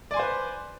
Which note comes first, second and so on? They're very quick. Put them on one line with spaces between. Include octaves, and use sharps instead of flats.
D5 G#5 C6 C5 B4